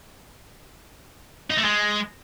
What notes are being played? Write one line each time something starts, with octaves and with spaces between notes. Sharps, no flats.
D#4
A3
G#3